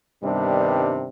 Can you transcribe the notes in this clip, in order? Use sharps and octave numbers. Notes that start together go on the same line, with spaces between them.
G2 C3 D#3 G3 B3 D4